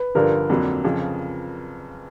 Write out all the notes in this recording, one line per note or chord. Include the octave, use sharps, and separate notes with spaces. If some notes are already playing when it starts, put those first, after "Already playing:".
Already playing: B4
G2 D3 F3 A#4
F2 D3 F#3 A#3
F2 C#3 F3